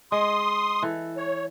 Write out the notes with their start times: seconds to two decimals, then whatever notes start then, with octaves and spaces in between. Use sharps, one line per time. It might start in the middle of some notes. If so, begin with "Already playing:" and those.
0.12 G#3 C6 D#6
0.82 E3 A4
1.17 C#5